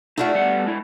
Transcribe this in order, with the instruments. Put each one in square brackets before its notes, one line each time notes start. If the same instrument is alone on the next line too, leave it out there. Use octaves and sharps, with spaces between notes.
[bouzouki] A3 D4 F#4 [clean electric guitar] D#4 F4 A4
[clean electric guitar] G3 B3 F#5
G#3 E4